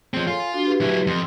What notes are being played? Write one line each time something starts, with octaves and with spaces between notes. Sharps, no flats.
F3 C4 G#4 C#5
F4 A4 G#5
D4 F#4 F5
G4 G#4 B4
F#3 E4
F2 C6